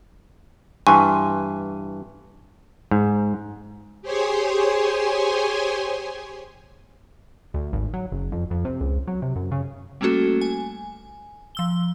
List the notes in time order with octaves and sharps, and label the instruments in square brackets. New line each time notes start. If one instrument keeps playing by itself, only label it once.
[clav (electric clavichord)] G2 E3 [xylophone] G#5 C6 C#6
[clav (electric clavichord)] G#2
[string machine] G4 G#4 C5 C#5 G#5 C6
[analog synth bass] D2
G#1
F#3
F#1
F2
F2
C3
C#2
F#3
C3
F#2
C#3
[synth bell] G3 A3 A#3 C#4 F#4 A4
G#5
F3 E6 G7